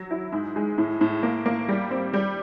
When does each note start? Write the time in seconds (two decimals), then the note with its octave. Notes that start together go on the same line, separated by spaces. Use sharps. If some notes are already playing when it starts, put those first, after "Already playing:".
Already playing: F#3
0.11 E4
0.32 G#2
0.56 G#3
0.78 A2
1.01 A2
1.23 A#3
1.46 A#3
1.69 G3
1.91 C4
2.14 G3